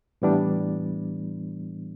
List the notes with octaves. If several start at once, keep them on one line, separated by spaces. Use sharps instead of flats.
A2 E3 G3 B3 D4